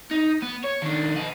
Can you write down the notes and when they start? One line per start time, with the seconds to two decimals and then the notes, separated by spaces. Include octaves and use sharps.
0.11 D#4
0.42 B3
0.64 C#5
0.82 D#3 D4
1.16 D#5 F#5